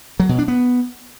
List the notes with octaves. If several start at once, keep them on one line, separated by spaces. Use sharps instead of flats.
F#3
B2
D4
B3